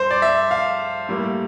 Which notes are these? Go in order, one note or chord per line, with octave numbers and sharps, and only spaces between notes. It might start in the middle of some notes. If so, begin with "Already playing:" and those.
Already playing: G2 C4 C5
D5
E5
F5
A2 G3 A#3